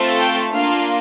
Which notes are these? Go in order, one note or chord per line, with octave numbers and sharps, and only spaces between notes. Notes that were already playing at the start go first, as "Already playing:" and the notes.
Already playing: A3 C4 F4 A4
G5
A#3 D4 F4 F5